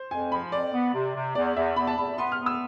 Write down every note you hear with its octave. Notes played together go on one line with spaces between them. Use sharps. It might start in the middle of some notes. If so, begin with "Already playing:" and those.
Already playing: C5
F2 G#5
F3 B5
F2 D5
B3
C3
C3
E2 D5
E2 E5
E2 B5
A5
E2 B5
B3 C6
F6
B3
E6